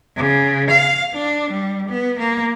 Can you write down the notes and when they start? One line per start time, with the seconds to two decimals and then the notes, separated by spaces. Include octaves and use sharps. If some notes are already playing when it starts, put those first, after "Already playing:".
0.16 C#3
0.70 F5
1.14 D4
1.51 G3
1.89 B3
2.19 A#3